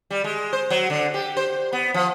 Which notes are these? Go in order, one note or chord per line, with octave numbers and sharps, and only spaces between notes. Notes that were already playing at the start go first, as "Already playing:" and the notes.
G3
G#3
C5
F#3
D3
G4
C5
B3
F3